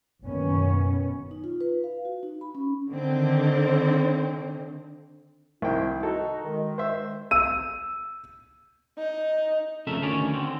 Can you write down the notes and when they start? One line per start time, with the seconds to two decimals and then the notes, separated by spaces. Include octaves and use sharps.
0.23 F#1 F#2 B2 D#3 B3 C#4
1.31 D#4
1.44 F4
1.61 B4
1.84 F5
2.05 F#4
2.23 D#4
2.41 B5
2.55 C#4
2.90 D3 D#3 C4
5.62 C2 D#3 C4 E4 G5
6.03 D#4 F#4 A4
6.45 D#3 G#3
6.78 C5 E5
7.31 E6 D#7
8.98 D#4
9.87 F2 C#3 A3 A4 A#4 E5
10.02 D2 D#3 C#4 C#5 D5
10.33 D3 C4